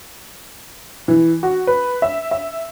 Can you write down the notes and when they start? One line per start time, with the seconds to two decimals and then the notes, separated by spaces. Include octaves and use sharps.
1.08 E3
1.43 F#4
1.67 B4
2.02 E5
2.31 E5